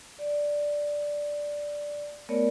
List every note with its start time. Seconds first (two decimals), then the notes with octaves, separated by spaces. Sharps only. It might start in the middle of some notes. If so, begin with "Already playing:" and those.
0.19 D5
2.29 A3 B3 A#4 C#5 D5 B5